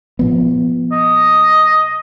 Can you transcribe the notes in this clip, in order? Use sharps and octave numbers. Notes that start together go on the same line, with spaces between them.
A#2 F3 B3
D#5